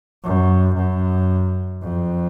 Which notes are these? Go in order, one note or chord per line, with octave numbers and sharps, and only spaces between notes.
F#2
F#2
F2